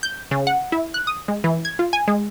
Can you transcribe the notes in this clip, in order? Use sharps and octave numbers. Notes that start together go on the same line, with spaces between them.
G6
C#3
F#5
E4
F#6
D#6
G#3
E3
G#6
F4
G#5
G#3